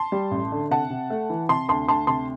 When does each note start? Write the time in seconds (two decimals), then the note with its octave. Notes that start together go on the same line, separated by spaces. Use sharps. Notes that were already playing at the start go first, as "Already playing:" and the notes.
Already playing: A5 C6
0.12 G3
0.31 A1
0.52 D3
0.71 C3 F#5 A5
0.90 C3
1.10 A3
1.30 E3
1.49 C3 A5 C6
1.68 D2 A5 C6
1.88 D2 A5 C6
2.07 C3 A5 C6